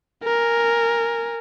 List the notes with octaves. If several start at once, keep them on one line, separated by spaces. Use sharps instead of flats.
A#4 G#5